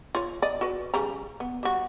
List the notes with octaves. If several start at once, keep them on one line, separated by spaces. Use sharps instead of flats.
F4 C#5
D5 D#5
F#4 B4
C#3 G3 A#5
B3
G3 F#4